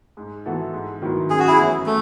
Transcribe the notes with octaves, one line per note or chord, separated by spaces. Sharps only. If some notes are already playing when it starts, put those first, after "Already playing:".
G#2
E3 B3 F#4 A4
G#2
D#3 F#3 B3 E4
F#2 G#4
F#4
E4 G#4
E3 B3 F#4 C#5
A3